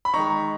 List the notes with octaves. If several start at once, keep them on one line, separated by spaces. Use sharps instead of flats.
B5
D#3 G#3 D#4 A#5 C#6